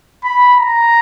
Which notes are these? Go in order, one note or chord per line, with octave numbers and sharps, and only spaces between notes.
B5
A#5